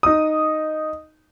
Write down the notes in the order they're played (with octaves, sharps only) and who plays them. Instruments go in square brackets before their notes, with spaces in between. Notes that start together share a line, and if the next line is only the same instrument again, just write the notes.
[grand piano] D#4 D#6